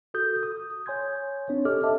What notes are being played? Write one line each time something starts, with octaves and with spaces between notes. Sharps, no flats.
F#4 A4 D#6 G6
D#6
C#5 G#5 C6 G6 G#6
C4 D4 C#5
G4 A4 D#5 D6 F6
A4 D#5 E5 A5